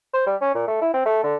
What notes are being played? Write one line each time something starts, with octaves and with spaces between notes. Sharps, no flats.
C5
G3
C#4
A#2
A3
E4
C4
A3
D3